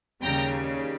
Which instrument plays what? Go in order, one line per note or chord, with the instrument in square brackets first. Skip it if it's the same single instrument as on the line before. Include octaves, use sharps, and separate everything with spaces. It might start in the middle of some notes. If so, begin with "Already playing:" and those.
[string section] D#2 C#3 G3 G5 A#5